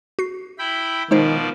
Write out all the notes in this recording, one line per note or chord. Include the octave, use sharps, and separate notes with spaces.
F#4 C7
E4 G5 B5
B2 D#3 F3 G#3 D#4 C5 D5